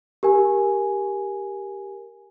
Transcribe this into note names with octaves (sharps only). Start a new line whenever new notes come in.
G4 A#4 G#5